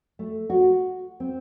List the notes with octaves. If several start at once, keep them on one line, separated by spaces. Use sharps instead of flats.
A3
F#4
C4